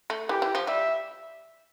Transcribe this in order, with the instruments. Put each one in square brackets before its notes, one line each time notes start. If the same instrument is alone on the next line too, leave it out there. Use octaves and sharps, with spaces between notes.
[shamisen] A3
[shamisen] E3 [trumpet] G4
[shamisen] E3
F3
[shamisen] G3 [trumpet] E5